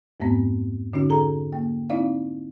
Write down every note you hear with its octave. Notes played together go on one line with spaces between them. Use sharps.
F2 G#2 A3 B3 C4
D3 C#4 D#4 F#4
G#4 A4 A#5
A#3 G5
C4 D#4 E4 D5 F5